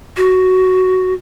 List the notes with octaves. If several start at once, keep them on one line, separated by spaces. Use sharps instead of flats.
F#4